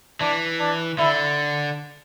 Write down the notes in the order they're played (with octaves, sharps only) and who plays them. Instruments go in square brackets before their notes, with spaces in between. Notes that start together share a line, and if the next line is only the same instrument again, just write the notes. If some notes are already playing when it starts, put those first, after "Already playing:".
[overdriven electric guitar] E3 [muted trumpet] D4
[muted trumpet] D4
[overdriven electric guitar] D3 [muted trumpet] E4